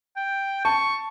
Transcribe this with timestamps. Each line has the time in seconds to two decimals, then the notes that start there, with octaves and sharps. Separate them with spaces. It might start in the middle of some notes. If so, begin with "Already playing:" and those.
0.16 G5
0.65 A5 C#6